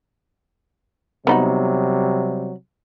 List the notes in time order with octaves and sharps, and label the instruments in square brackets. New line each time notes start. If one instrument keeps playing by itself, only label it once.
[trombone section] C3 F#3 G3 [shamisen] B3 D#4 F#4